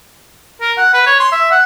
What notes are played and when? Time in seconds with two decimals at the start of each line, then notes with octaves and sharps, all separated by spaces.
0.61 A#4
0.78 F#5
0.94 B4
1.07 C#5
1.20 C6
1.33 E5
1.51 F#5